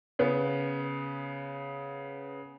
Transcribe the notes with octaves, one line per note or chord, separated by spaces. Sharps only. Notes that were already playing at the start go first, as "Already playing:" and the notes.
C#3 B3